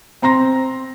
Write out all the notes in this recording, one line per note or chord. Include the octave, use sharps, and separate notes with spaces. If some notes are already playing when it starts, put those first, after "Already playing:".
C4 A#5 C6 A#6